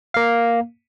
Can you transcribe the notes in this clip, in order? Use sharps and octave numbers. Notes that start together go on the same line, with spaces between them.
A#3 F5